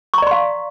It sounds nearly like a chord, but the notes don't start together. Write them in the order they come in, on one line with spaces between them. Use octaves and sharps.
C#6 A#5 D5 C6 F5